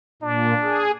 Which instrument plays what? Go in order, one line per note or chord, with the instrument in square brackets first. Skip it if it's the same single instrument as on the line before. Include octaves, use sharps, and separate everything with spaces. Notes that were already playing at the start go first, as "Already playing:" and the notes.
[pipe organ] A#2 [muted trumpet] D4
[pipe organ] G#4